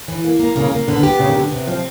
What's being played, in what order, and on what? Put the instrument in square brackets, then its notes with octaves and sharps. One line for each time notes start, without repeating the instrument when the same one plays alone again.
[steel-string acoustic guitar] E3
A#3
A#3
[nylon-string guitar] C#3 [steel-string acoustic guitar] A#3
[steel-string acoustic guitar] A#3
[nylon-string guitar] D3 [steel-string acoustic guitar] B3
[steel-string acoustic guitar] G4
[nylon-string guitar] C#3 [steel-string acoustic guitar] B3
[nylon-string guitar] D#3
[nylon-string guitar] D3 [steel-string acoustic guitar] B3
[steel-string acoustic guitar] C3
[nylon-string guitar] F3 [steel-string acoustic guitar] C4